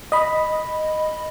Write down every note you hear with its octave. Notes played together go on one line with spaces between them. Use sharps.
D#5 B5